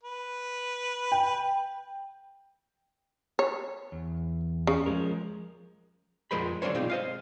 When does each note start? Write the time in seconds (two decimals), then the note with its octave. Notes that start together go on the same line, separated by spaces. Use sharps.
0.03 B4
1.12 G5
3.39 C#5
3.92 E2
4.67 C#3
4.86 F3 G#3 A#4
6.31 F2 F3 G#3 A#4 C5 B5
6.62 D3 F#3 D4 A#4 C5 C#5
6.75 B1 G#3 C4 D#4 F4
6.90 C5 D#5 F5